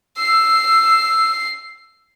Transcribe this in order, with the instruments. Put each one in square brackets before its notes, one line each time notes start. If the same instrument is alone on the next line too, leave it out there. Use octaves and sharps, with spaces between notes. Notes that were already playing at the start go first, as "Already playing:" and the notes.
[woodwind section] E6 [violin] C7